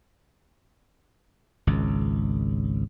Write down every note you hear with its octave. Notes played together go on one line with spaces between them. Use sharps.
G#1 C#2